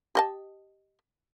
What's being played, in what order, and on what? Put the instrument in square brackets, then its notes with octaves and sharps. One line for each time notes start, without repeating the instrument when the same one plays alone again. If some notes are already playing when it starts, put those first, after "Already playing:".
[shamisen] G4 D#5 A5